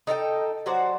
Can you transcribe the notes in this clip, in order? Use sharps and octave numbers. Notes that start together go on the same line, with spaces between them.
D#4 A4 A#4 G5
F#3 F#4 C5 D5